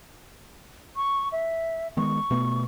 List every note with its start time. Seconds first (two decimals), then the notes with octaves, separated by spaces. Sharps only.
0.96 C#6
1.32 E5
1.97 D#3 G#3 B3 C#6
2.31 B2 A3 B3